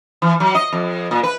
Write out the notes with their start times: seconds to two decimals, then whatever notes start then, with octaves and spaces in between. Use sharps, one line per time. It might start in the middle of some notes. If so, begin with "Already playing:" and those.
0.22 E3
0.40 F#3
0.55 D#5
0.72 F2
1.11 A#2
1.23 B4